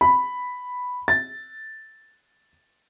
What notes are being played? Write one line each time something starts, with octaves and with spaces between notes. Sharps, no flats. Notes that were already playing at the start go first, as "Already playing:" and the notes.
B5
A6